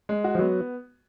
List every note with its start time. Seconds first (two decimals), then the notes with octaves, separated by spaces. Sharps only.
0.09 G#3
0.24 F#4
0.35 F3
0.39 F#3 B3